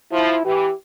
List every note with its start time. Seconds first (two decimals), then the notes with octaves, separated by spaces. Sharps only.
0.13 F3 E4
0.45 E3 G4